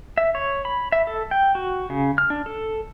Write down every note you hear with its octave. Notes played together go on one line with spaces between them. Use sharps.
E5
C#5
B5
E5
A4
G5
F#4
C#3
F6
D4
A4